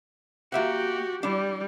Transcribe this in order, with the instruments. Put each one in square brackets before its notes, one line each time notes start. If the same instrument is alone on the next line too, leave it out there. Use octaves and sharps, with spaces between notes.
[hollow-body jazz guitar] A#3 E5 F#5 [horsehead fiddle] F#4 G4
[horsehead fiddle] G3 [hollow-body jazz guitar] D4 E4